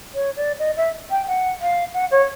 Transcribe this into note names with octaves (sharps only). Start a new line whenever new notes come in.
C#5
D5
D#5
E5
G5
F#5
F5
F#5
C#5